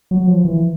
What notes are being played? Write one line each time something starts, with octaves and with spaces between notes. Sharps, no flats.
F#3
F3
E3